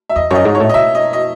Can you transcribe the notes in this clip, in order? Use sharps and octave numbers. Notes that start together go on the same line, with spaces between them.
E5
E2 D#5
F#2 C#5 D#5
G#2
C#5
A2
D#5
B2 E5
D#5
D#5